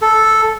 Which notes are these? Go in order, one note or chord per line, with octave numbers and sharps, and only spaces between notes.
A4